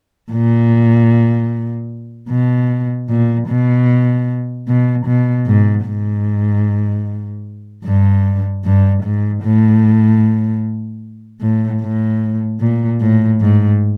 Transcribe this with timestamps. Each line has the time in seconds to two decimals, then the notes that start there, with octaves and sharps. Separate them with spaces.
0.31 A#2
2.30 B2
3.09 A#2
3.48 B2
4.68 B2
5.06 B2
5.47 G#2
5.86 G#2
7.85 G2
8.65 G2
9.03 G#2
9.43 A2
11.41 A2
11.82 A2
12.60 A#2
13.00 A2
13.41 G#2